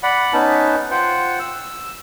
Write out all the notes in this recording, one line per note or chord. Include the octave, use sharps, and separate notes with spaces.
D5 F#5 B5
B3 C#4 D#4 B4 A5
F4 C5 F#5 G5
E6